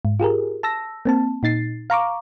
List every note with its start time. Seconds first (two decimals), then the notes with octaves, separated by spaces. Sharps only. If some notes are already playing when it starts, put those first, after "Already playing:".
0.05 G#2
0.20 F4 G4 G#4 A#4
0.63 A5 E6 A#6
1.05 A#3 C4 A5
1.43 A#2 D#4 A6 C7
1.90 F5 A#5 C#6 D6